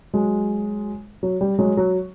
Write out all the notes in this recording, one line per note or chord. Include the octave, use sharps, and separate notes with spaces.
F#3 G#3
F#3
G3
F#3 G#3
F#3